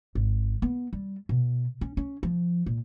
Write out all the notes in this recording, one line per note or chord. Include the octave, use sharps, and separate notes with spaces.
G#1
B3
G3
B2
C#4
C#4
F3
A#2